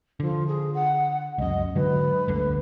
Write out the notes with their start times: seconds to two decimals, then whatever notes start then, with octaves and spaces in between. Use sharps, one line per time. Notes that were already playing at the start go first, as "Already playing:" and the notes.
0.20 D3 F3
0.47 G#4
0.74 F#5
1.38 C#2 F#2 D#5
1.75 G#2 D3 F#3 B4
2.28 G1 D2 D3